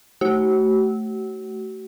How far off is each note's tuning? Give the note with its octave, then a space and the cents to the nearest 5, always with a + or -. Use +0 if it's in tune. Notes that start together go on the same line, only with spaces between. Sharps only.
A3 +0 F#4 +40